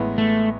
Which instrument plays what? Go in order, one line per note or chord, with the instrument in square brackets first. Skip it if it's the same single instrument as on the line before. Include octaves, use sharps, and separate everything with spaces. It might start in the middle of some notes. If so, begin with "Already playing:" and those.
Already playing: [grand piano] A1 A2 G#3 B3 E4
[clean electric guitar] A3